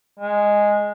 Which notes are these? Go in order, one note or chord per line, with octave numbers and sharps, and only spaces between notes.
G#3